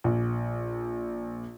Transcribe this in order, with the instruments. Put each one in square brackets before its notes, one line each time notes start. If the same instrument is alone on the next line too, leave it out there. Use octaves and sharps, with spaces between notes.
[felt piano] A#1